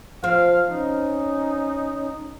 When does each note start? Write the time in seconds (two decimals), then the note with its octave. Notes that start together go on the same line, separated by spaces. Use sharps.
0.24 F3 C4 F5
0.69 C#4 D#4